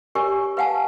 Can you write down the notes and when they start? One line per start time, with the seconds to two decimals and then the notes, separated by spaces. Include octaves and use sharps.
0.15 G4 A#4 C#5 G#5 C#6
0.57 B4 F5 F#5 G#5 A5